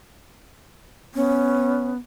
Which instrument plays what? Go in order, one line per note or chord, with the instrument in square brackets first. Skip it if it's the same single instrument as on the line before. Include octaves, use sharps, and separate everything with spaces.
[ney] B3 [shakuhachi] C#4